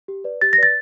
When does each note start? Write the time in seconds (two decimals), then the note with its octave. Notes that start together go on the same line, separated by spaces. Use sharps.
0.08 G4
0.24 B4 D5
0.41 G4 A6
0.53 A#6
0.58 B4 D5 A6